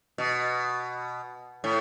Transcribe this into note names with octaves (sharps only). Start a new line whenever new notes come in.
B2
A2